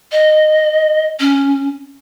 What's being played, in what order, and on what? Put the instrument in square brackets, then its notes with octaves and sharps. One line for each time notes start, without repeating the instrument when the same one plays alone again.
[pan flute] D#5
C#4